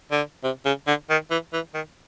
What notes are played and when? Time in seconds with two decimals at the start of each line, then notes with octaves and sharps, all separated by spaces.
0.12 D3
0.44 C3
0.66 C#3
0.87 D3
1.10 D#3
1.31 E3
1.53 E3
1.74 D#3